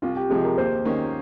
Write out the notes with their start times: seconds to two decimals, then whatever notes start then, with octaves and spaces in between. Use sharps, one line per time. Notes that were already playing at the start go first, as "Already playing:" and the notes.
0.02 C2 F4
0.16 G4
0.30 C3 F3 G#3 G#4
0.44 A#4
0.58 D#2 C5
0.85 D#3 A#3 C#4